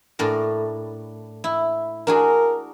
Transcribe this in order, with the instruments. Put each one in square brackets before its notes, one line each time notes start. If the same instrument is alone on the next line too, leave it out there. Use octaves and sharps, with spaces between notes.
[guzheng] A2 D4 A#4
E4
[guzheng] D4 F#4 G#4 [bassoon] A#4